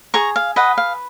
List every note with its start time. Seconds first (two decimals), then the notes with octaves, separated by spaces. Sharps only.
0.14 G#4 A#5 C#6
0.36 F5
0.56 B4 D#5 F#5
0.78 F5